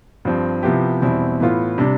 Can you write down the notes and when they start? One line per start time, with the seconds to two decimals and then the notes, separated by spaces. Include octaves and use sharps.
0.25 G2 F3 C4
0.63 C3 F3 B3 E4 G4
1.02 E2 B2 G3 C4 E4
1.40 A2 E3 B3 F4
1.78 C3 G3 D4